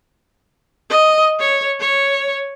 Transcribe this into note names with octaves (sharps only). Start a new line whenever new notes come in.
D#5
C#5
C#5